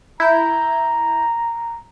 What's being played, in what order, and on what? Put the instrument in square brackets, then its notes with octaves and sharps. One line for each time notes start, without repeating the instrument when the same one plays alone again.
[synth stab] E4 G6 [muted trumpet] A#5